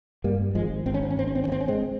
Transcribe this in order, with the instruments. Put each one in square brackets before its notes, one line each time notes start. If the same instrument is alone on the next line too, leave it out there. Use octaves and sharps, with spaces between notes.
[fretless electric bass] G2 G3 A#3
G#1 F3 G#3
G#1 C4
C#4
C4
C#4
G#1 C4
C#4
C4
C#4
G2
C4
C#4
G#3 C4